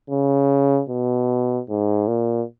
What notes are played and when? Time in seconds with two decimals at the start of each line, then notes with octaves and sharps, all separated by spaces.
0.10 C#3
0.89 B2
1.69 G#2
2.08 A#2